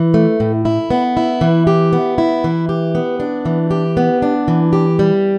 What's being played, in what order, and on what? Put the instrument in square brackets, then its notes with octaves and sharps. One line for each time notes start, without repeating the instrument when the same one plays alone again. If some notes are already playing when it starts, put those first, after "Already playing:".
Already playing: [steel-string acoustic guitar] E3
A3
A2
E4
B3
E4
E3
G4
B3
E4
E3
G4
B3
D4
E3
G4
B3
D4
E3
G4
G3